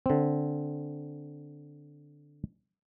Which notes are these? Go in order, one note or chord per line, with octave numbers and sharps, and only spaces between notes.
D3 C4